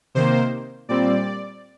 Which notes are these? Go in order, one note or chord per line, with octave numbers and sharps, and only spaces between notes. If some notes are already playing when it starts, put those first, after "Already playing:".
C3 D#3 A#3 C5
A#2 G3 C4 D5